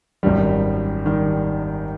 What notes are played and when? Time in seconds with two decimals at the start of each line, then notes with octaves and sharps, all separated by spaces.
0.23 G#1 F#2 D#3 G3
1.06 D#3 G3